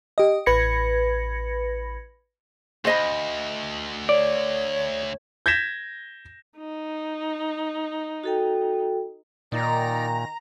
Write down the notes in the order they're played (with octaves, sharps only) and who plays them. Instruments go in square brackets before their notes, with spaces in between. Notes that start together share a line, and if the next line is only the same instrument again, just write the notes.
[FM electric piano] G4 D#5
A1 B4 B5 G#6 A#6 C#7
[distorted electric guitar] D2 [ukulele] C5 D#5 B5
[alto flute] C#5 [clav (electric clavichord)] D5
[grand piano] G6 G#6 A#6 B6 E7
[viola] D#4
[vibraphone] F#4 A4 G5
[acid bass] A#2 [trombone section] D#3 [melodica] D#4 D5 [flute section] A#5